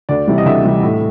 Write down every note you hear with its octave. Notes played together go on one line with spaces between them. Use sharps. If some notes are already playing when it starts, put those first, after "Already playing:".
D2 D5
C3 E3 G3
D#5
D2 E5
C3 E3 G3
A2